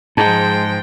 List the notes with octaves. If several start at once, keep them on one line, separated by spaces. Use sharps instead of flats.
G#2 F3 G#3 G5 A5